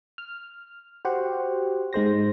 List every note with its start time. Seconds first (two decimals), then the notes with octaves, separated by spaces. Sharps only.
0.18 F6
1.05 F#4 G4 C5 F#5
1.93 G#2 G#3 C5 A#6